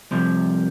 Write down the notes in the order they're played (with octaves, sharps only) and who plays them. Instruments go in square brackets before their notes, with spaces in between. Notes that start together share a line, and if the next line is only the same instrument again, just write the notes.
[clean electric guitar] C2 C3 F3